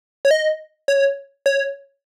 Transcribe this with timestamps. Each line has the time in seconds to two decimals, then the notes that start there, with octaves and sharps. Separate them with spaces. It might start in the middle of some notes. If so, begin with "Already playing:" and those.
0.25 C#5
0.31 D#5
0.88 C#5
1.46 C#5